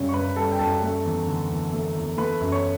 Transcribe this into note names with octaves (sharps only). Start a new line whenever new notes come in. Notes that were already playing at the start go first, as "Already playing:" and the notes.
Already playing: F#2 C#3 G3 C#5
C#6
F#2 B4 B5
G3 A4 A5
G5
F#2 A4 A5
A3
E2
D3
E2
A3
E2
A3 B4 B5
F#2
C#5 C#6